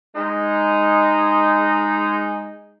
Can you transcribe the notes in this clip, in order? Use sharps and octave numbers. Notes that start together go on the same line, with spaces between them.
G#3 D#4